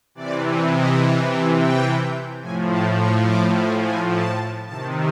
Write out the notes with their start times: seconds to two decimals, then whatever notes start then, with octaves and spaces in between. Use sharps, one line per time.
0.15 C3 E3 D5
0.71 D#5
1.28 G5
1.57 G5
2.41 A2 F3 G#5
2.70 A5
2.98 C#6
3.27 D6
3.55 G#5
3.83 G#5
4.11 A5
4.68 C3 D#3 A5